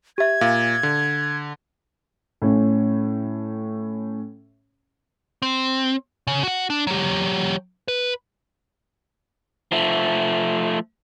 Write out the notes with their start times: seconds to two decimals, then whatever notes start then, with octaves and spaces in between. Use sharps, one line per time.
0.18 G4 E5 G#6
0.41 A#2 F5
0.83 D3
2.42 A2 C#4
5.42 C4
6.27 C#3
6.43 F#4 F#5
6.70 D4
6.87 F#3 G4
7.88 B4
9.72 F3 A3